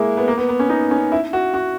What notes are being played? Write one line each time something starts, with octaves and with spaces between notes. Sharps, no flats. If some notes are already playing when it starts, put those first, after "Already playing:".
Already playing: G#3 A#3 E4
B3
A#3
B3
B3
C#4
D#4
C#4
E4
F#4
F#4